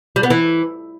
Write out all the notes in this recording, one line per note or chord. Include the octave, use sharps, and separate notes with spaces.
G3
B3
E3